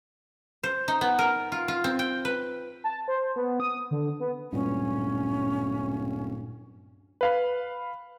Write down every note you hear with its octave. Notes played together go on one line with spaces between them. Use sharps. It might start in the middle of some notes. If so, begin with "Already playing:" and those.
C5
D#4
B3
A#4
F4
F4
C4
G5
B4
A5
C5
B3
D#6
D3
B3
D1 G2 A#2 C#4
B4 F5 B5